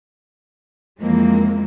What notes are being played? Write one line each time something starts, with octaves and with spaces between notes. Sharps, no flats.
F2 E3 G#3 A#3 C4